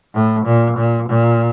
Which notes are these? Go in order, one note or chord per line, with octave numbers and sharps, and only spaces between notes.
A2
A#2
A#2
A#2